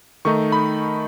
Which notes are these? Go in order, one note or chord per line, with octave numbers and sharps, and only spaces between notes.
D#3 A3 D#4 C#6
B5